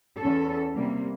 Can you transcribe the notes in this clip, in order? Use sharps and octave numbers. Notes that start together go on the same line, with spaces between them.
E2 C#4 A4
C3 G3 A#3